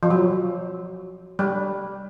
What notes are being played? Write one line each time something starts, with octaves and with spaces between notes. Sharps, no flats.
F3
F#3
G3